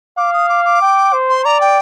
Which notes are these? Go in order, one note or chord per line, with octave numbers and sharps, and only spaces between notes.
F5 D6
D#6
D6
D6
G5
C5
C6
D5 A#5
G5